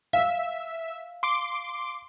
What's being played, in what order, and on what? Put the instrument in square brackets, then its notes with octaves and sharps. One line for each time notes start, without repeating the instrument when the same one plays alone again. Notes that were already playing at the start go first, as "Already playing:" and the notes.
[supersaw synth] E5 [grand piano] F5
[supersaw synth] C6 D6